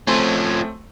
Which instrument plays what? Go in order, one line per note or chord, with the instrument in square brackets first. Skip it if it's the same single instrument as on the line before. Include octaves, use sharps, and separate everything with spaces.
[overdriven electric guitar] F3 C#4 [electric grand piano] A3 C4 C6